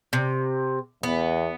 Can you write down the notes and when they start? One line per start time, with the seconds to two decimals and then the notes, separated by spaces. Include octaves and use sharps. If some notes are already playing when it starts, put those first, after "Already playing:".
0.13 C3
1.03 E2 B3